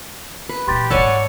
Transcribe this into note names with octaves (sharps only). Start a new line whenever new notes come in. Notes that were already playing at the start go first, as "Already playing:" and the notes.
B4
A#2 E3 G4 C6 A6
G#2 G3 C#5 D5 F#5 G#5 A5 E6